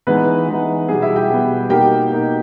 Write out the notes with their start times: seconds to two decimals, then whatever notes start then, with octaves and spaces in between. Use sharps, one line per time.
0.07 E3 G#3 B3 D#4 B4
0.48 E3 G#3 B3 D#4
0.88 B2 G3 B3 G#4
1.02 E4 E5
1.16 G4 G5
1.29 B2 G3 B3
1.70 B2 A#3 D#4 G4 G5
2.10 B2 A#3 D#4